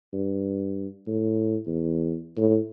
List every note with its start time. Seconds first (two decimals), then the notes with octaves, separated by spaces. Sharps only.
0.13 G2
1.07 A2
1.67 E2
2.38 A2